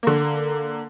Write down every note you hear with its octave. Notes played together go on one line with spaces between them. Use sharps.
D3 A#3